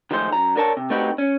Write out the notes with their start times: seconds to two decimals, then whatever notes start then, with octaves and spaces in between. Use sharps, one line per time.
0.11 D#3 F3 G#3 A3 C5
0.32 F#2 A#5
0.56 D3 D4 A#4 C#5 A5
0.77 C3
0.90 A3 C4 D#4 F#4 G4 B4
1.18 C#4